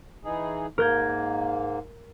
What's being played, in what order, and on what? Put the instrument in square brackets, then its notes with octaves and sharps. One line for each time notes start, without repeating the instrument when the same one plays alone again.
[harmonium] E3 D#4 G#4
[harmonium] G#2 A#3 [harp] A#4 G6 G#6